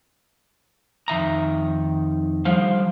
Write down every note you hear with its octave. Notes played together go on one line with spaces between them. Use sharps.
F2 D#3 E5 A#5
D3 F3 G3 C5 F5